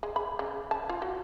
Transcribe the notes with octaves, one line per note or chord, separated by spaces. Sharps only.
G#3
B5
C#3
A5
F4
F#4